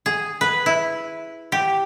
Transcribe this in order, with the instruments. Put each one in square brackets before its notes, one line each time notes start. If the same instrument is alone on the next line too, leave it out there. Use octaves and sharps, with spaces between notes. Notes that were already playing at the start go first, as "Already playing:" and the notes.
[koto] G#4
B4
E4
G4